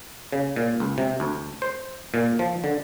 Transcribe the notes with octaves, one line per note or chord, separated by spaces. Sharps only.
C#3
A#2
C#2
C3
D2
C5
A#2
F3
D3